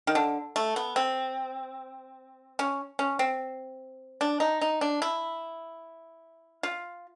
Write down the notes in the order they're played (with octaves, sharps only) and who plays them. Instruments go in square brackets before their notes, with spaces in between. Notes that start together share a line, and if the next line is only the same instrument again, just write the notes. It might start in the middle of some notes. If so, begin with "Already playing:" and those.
[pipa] D#3
D3
A3
B3
C4
C#4
C#4
C4
D4
D#4
D#4
D4
E4
F4